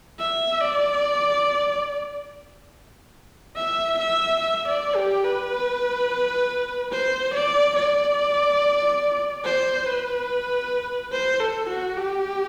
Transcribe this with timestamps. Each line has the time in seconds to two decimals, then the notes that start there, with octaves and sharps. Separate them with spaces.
0.19 E5
0.61 D5
3.56 E5
3.97 E5
4.40 E5
4.67 D5
4.95 G4
5.24 B4
6.92 C5
7.34 D5
7.76 D5
9.45 C5
9.86 B4
11.12 C5
11.40 A4
11.69 F#4
11.97 G4